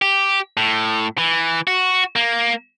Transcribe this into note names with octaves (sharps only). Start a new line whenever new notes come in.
G4
A2
E3
F#4
A#3